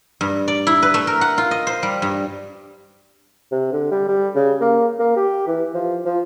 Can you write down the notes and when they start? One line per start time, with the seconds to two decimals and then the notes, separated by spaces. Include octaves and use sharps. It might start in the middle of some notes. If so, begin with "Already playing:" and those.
0.21 G2
0.48 D5
0.67 E4
0.83 B4
0.94 A3
1.07 A#4
1.21 F#5
1.38 F4
1.51 D#5
1.67 C5
1.83 G3
2.02 G2
3.52 C3
3.72 D3
3.92 G3
4.08 G3
4.35 C#3
4.61 A#3
4.99 A#3
5.16 G4
5.47 E3
5.75 F3
6.05 F3